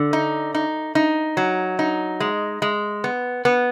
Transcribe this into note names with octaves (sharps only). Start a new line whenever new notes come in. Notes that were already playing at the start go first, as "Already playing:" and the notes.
Already playing: D3
D#4
D#4
D#4
F#3
D#4
G#3
G#3
B3
B3